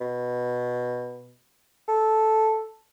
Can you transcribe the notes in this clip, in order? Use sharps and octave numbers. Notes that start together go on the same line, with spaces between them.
B2
A4